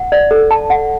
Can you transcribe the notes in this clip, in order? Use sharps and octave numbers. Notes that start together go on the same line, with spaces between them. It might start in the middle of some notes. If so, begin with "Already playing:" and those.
Already playing: F#5
D5
A4
A5
F#5